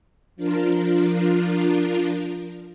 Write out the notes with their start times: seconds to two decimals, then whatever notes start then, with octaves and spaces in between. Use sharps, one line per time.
0.36 F3 D4 F4 A#4